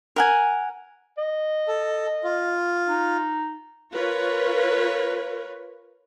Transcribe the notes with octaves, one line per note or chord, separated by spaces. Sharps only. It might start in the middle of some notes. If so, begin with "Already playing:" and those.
A#4 F#5 G#5
D#5
A4
F4
D#4
F4 A#4 B4 C#5